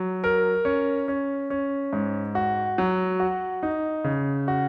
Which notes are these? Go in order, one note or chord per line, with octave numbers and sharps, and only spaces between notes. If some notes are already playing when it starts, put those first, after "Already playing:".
Already playing: F#3
A#4
C#4
C#4
C#4
G#2
F#4
F#3
F#4
D#4
C#3
F#4